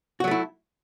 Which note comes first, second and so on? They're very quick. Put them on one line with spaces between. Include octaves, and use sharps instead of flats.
F#4 F#3 A3 E4